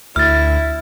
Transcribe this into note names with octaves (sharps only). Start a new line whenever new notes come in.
D2 E4 F6 A6